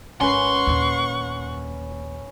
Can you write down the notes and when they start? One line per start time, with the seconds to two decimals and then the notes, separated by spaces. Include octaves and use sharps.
0.21 G#1 C#4 B4 F#5 C6 C#6
0.67 D#2 A#2